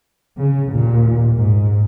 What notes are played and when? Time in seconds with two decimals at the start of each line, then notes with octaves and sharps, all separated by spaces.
0.39 C#3
0.71 D#2 A#2
1.37 G#2